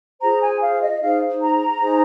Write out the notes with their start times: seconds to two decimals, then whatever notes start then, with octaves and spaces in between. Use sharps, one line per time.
0.22 F4 G#4 C5 A#5
0.41 G#5
0.62 F5
0.82 D#5
1.01 D#4 G#4 C5 F5
1.41 A#5
1.80 D#4 G#4 C5